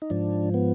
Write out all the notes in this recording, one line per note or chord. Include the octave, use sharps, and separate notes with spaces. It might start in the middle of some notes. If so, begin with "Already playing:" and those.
D#4
G#2 F3 D4
B3